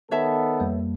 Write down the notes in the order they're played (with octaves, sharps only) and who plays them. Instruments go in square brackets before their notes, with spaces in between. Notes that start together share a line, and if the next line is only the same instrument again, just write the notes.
[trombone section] D#3 B3 A4 [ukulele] C#5 E5 A5
[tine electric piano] F2 G3 A#3